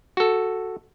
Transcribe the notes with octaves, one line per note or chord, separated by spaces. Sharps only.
F#4 A4